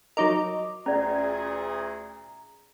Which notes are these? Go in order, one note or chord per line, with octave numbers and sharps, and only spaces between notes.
F#3 D#4 A#4 D#5 D6
D2 A#2 C#4 G#4 D5 A#5